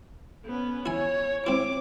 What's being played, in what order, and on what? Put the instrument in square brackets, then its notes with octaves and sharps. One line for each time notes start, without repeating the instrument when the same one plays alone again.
[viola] B3 C#4
[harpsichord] E4 G#5 [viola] C#5
[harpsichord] C4 E4 [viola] D6